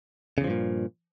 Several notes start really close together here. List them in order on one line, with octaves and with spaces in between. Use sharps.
C#3 E2 F3 G2 A#2